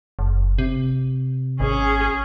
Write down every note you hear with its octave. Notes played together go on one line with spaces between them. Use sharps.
F#1
C3
G#1 C#4 G#4